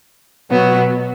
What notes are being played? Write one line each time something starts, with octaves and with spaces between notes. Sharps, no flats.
B2 F#3 B3 F#4